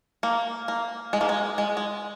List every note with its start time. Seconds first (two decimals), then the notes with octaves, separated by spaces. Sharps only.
0.23 A#3
0.68 A#3
1.13 G#3
1.21 A#3
1.29 G#3
1.58 G#3
1.77 G#3